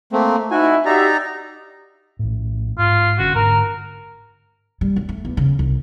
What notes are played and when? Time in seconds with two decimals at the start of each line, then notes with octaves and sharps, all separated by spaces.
0.13 A3 A#3 C4
0.51 D#4 E4 F#4 G#5
0.85 D#4 F#4 G4 D5 E5 A#5
2.19 A#1 A2
2.79 G#2 F4
3.19 F#1 D3 C#4 F#4
3.35 G#2 D3 C#4 A#4
4.81 G3
4.96 F#2
5.09 A3
5.25 E2
5.37 C#3
5.59 C2